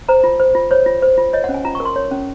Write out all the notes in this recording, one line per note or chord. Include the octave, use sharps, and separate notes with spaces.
C5 A#5
F4
C5
F4
C5 C#5
F4
C5
F4
C#5 D#5
F#5
C#4
G#5
F4 A#5
C#6
A#4
C6
C#5
C#4